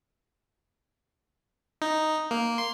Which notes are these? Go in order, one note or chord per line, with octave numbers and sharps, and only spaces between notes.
D#4
A#3
C6